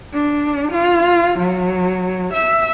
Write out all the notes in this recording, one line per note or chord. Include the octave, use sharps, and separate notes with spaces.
D4
F4
F#3
E5